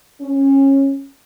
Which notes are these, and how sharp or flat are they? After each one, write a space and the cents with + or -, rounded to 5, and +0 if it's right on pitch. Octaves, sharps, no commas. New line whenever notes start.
C#4 -20